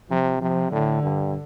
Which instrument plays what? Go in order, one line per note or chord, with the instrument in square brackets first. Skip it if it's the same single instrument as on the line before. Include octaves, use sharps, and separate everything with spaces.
[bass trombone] C3 [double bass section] F3
[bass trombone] C3 [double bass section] F3
[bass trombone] A2 [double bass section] D3
[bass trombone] G2